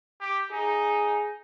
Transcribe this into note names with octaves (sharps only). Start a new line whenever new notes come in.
G4
D#4 G#4